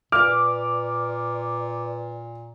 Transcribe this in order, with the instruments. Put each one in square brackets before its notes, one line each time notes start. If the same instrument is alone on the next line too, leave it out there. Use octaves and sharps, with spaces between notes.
[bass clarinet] A#2 [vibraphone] B4 D5 [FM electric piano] D6 [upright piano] F6